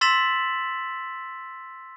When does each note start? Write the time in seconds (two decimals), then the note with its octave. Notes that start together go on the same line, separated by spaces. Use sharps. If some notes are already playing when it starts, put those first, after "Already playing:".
0.01 C6 E6 A6 B6 E7 F#7